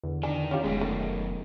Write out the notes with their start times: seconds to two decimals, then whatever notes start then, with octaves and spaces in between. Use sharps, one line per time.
0.03 E2 D3
0.23 D#3 D4 G#5
0.51 C#4 F4 G4
0.64 F1 F#2 B2 G#3
0.81 D#3 A3